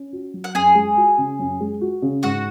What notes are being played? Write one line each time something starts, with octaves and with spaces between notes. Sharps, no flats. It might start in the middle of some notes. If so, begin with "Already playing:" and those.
Already playing: C#4
F#4
F#3
F#5
F#2 G#4 G#5
G#3
F#4
C#3
F#2
G#3
F#4
C#3
G#2 F#4 F#5